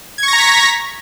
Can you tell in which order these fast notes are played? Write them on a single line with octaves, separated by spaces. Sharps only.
G#6 C#6 A#6 A#5 B6